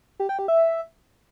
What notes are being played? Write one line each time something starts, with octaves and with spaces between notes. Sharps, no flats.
G4
G5
G4
E5